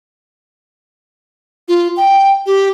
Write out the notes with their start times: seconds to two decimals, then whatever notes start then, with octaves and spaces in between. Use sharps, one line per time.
1.68 F4
1.97 G5
2.46 G4